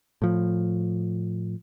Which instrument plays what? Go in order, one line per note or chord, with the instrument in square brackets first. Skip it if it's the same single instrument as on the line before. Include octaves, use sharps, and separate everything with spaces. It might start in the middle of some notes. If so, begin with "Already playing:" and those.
[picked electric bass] A2 F3